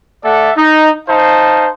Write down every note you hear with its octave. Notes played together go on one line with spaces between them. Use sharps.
A3 A4 D5 E5 F#5
D#4
D#4 C5 F5 A5